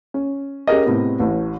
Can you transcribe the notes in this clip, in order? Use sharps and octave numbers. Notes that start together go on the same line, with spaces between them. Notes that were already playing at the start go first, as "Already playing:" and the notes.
C#4
C#4 G4 G#4 A#4 D#5
A2 C3 B3
A1 A2